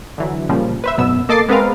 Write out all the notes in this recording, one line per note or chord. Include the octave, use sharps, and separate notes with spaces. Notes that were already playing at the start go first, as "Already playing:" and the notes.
D3 E3 F#3
A#2 C#3 F3 G3
B4 C5 E5
G#1 F#2 B2 B3 E6
A#3 A4 D#5 D6 A6 C7
G#3 B3 C4 A#4 B4 F5